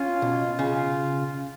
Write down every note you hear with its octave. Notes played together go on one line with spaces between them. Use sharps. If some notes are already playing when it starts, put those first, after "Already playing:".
Already playing: C#4 F4
B2
C#3 F4